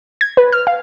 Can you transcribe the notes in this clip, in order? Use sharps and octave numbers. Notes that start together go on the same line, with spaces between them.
G#6
B4
F6
F5